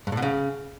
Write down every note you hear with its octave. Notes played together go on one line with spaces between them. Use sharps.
G2
A2
B2
C#3